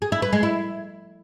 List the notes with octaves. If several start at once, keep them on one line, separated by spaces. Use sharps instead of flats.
G#4
E4
B4
G#3
E4